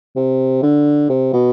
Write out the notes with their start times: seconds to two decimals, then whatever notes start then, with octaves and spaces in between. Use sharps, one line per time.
0.16 C3
0.63 D3
1.10 C3
1.33 B2